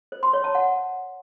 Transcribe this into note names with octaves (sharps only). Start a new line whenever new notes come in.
C5
C6
C#5
A5
F#5